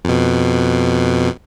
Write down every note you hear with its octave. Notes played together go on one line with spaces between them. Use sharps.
F2 B2